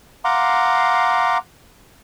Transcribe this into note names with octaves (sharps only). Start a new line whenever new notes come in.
F5 F#5 A#5 C6 D6